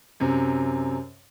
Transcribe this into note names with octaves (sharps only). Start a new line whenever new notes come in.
F#2 C3